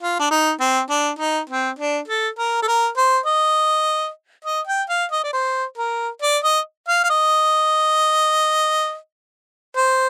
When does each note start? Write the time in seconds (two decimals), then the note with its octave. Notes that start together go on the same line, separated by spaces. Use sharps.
0.01 F4
0.19 D4
0.31 D#4
0.60 C4
0.90 D4
1.19 D#4
1.50 C4
1.79 D4
2.08 A4
2.38 A#4
2.62 A4
2.68 A#4
2.97 C5
3.26 D#5
4.45 D#5
4.67 G5
4.89 F5
5.11 D#5
5.24 D5
5.33 C5
5.78 A#4
6.22 D5
6.44 D#5
6.88 F5
7.04 F5
7.10 D#5
9.77 C5